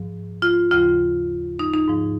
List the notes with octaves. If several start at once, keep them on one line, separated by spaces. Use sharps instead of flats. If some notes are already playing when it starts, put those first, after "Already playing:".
Already playing: G#2 F3
F4
D#2 C#3 F3 F4
D#4
D#4
G#2 F3